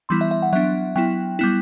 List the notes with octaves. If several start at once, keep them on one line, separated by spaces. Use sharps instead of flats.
E3 G3 B3 E4 C6
E5
E5
F#5
F#3 B3 D4 E5
F#3 B3 E4 G5
G3 B3 E4